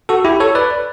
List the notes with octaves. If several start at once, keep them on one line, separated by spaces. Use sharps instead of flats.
F#4 A4
E4 G4
A4 C#5
B4 D5